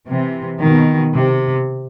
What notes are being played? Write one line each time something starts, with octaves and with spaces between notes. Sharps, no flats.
C3 E3
B2 D#3
C3